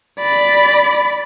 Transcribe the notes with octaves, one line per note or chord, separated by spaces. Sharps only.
D5 B5